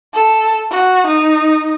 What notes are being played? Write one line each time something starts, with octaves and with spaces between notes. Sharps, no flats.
A4
F#4
D#4